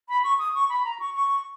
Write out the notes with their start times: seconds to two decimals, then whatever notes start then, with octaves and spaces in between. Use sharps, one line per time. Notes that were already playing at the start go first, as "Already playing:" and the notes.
0.09 B5
0.24 C#6
0.39 D#6
0.55 C#6
0.70 B5
0.85 A#5
1.00 C#6
1.15 C#6